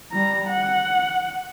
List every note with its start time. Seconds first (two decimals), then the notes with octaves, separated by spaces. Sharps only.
0.12 G3 A#5
0.48 F#5